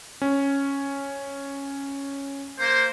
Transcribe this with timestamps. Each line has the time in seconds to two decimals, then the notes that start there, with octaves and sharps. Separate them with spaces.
0.22 C#4
2.60 A#3 C5